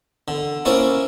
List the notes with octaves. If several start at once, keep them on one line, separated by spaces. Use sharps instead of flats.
D3
A#3 C#4 E4 C5 D5